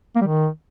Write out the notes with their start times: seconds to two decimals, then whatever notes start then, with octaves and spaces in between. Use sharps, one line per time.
0.16 A#3
0.21 G3
0.27 D#3